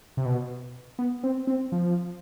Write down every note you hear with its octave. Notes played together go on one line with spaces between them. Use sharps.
C3
B2
B3
C4
C4
F3